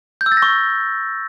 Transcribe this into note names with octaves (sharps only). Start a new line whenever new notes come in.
G6
E6
A6
A#6
C#6